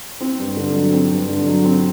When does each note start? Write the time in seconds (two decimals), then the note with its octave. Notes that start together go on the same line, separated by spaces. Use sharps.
0.21 C4
0.38 G2
0.56 D3
0.75 F#3
0.93 C4
1.11 G2
1.28 D3
1.47 F#3
1.64 C4